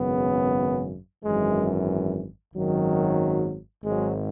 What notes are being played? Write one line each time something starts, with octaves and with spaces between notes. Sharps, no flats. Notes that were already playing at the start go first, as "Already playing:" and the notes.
Already playing: G#1 F#2 C#3 B3
G#1 F#2 E3 G#3
G#1 F#2 D#3 F#3
G#1 G#2 F#3 G#3